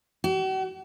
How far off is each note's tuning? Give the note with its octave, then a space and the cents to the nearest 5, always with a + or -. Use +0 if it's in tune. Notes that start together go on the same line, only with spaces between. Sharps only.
F#4 +45